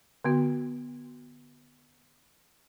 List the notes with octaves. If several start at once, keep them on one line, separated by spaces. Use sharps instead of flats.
D3 B3 F#4